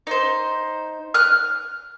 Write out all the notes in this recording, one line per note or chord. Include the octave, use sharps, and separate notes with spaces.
D#4 C5
F6 F#6